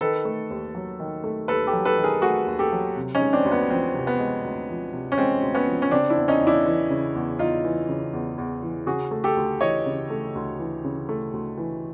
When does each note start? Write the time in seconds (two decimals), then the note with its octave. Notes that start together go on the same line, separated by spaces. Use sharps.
0.01 D#3 A4 B4
0.25 A3
0.50 D#2
0.75 F#3
1.00 D#3
1.24 A3
1.48 D#2 A4 B4
1.67 G4 A4
1.73 F#3
1.85 A4 B4
1.98 D#3
2.04 G#4 A#4
2.22 A3 F#4 G#4
2.46 D#2
2.59 G4 A4
2.72 F#3
2.96 C3
3.15 C#4 D#4
3.21 G#3
3.33 C4 D4
3.45 D2
3.52 B3
3.70 F3 C4
3.95 C3
4.07 B3
4.19 G#3
4.44 D2
4.69 F3
4.93 C3
5.12 C#4
5.18 G#3 C4
5.42 D2
5.55 B3 C#4
5.67 F3
5.82 C#4
5.91 C#3 C4 D4
6.10 D4 E4
6.16 E2
6.28 C#4 D#4
6.41 E2
6.47 D4 E4
6.66 E3
6.90 C#3
7.15 E2
7.39 E2 D#4 F4
7.64 E3
7.89 C#3
8.13 E2
8.38 E2
8.63 E3
8.87 C#3 F#4 G#4
9.11 A3
9.24 G4 A4
9.37 D2
9.61 E3 C#5 D#5
9.86 C#3
10.10 A3
10.35 D2
10.59 E3
10.84 C#3
11.09 A3
11.33 D2
11.58 E3